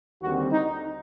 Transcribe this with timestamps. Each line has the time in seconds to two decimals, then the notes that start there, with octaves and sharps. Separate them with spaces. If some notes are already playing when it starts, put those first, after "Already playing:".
0.22 D#2 D3 G3 C4 F#4
0.52 D#4